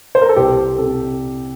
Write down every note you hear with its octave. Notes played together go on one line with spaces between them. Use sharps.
C5
A#4
A4
C2 G4
C3 A4